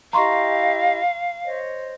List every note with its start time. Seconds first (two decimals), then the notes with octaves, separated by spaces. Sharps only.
0.13 E4 G4 D#5 F5 A#5 C6 C#6
1.44 C5 C#5 D#5